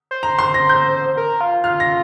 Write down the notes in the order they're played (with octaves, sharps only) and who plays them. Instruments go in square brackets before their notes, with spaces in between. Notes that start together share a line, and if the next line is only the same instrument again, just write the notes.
[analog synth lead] C5
[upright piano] A#5
C6
A#6
G6
[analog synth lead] A#4
F4
[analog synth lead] F4 [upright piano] F6
[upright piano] A#6